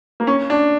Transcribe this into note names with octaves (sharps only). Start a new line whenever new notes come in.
A#3
C#4
D4